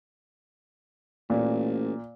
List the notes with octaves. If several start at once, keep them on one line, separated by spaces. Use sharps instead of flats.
A1 A#2